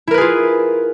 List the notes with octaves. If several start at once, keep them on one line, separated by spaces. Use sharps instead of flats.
E4 F4 G#4 A#4 B4